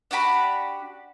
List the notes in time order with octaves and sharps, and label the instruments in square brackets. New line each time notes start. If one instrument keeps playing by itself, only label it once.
[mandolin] D4 F#4 G4 B5